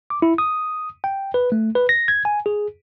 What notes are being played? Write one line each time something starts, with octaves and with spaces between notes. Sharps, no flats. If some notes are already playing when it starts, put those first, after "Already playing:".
D6
E4
D#6
G5
B4
A3
B4
A#6
G#6
G#5
G#4